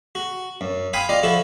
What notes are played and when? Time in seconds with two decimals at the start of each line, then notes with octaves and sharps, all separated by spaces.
0.15 F#4
0.61 F#2
0.93 F5 G5 G#5 B5 C6 D#6
1.09 F4 D5 D#5
1.23 F3 E4 F#4 A4